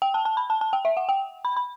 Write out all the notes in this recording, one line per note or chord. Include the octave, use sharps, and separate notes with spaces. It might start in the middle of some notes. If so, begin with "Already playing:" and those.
G5
A5
A5
B5
A5
A5
G5
E5
F#5
G5
B5
B5